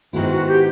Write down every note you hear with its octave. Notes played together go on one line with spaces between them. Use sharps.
G#2 D#3 G#3 B3 E4 F#4
F#4
G4